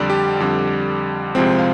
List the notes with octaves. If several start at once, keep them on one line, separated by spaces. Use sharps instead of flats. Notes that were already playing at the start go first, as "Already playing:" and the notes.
Already playing: F2 D3 G3 D5
G4
F2 D3 G3 G4
C2 C3 F3 G#3 C4 C5
F5